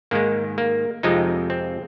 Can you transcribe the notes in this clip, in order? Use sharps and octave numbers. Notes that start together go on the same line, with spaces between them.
G#2 D#3 G#3 A#3
A#3
F2 C3 F3 G#3 D#4
C4